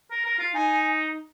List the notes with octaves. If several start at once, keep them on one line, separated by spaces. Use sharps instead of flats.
A#4
A#4
F4
D#4 G#5